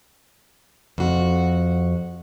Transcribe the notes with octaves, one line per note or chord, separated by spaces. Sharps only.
F2 F#4